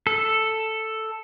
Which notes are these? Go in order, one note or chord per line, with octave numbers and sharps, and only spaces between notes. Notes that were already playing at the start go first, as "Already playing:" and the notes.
A4